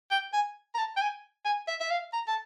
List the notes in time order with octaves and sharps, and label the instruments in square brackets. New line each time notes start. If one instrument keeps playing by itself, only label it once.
[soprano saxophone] G5
G#5
A#5
A5
G5
G#5
G#5
E5
E5
F5
A#5
A5